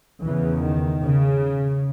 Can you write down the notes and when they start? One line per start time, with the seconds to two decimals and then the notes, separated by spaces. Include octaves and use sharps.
0.22 E2 C#3 E3
0.62 D#3
1.02 C#3